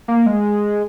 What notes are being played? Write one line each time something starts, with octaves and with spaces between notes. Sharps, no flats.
A#3
G#3